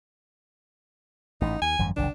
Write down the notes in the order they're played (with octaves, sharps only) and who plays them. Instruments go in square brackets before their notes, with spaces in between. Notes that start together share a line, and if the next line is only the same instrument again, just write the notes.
[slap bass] A1 G#2 [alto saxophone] D#4
[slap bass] D#2 [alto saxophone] G#5
[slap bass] G#1 F#2 F3
[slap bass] F#1 C2 D#3 [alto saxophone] D4